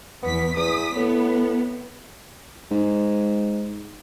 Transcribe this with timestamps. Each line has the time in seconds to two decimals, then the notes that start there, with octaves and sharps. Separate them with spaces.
0.23 E2 B3 B6
0.56 E2 D#6 B6
0.96 A2 B3
2.71 G#2